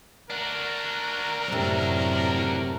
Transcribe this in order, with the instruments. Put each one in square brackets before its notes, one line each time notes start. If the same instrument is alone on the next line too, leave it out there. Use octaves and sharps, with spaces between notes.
[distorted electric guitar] D4 F#4 [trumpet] A#4
[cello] F#2 A2 [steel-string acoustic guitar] C3 C4